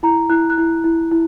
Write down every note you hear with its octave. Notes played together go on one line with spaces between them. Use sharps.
E4 A#5
E4 F#6
F#6
E4
E4
E4